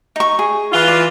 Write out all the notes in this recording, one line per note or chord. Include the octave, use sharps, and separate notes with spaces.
D#4 C#6
G#4
E3 F4
D5